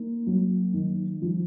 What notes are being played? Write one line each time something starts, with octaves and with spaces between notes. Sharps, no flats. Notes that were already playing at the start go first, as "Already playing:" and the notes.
Already playing: A#3 D#4
F#3
D#3
F3